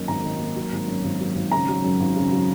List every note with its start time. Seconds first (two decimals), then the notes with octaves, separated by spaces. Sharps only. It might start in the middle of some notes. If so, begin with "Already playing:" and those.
Already playing: F#2 D#3 A#3
0.08 G#1 A#5
0.24 D#3
0.40 A#3
0.56 F#3
0.72 G#1
0.88 F#2
1.04 G#1
1.20 F#3
1.35 G#1
1.51 C#3 A#5
1.69 F#3
1.84 F#2
2.00 G#1
2.16 C#3
2.32 F#3